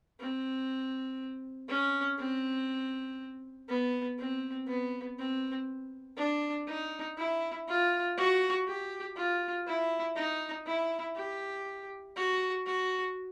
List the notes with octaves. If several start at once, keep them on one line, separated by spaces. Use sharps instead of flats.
C4
C#4
C4
B3
C4
B3
C4
D4
D#4
E4
F4
F#4
G4
F4
E4
D#4
E4
G4
F#4
F#4